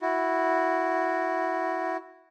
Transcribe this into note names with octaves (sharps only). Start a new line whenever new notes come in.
E4 F#4